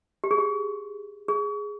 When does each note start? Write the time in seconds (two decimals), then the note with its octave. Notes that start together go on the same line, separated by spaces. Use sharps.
0.24 G4
0.31 G#4
0.38 G4
1.28 G#4